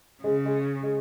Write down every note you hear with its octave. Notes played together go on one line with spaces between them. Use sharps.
C#3 G#3
G#3
G#3